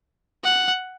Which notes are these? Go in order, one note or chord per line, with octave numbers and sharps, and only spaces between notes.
F#5